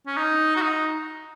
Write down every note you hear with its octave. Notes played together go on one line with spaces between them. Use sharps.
C#4
D#4
F#4
D#4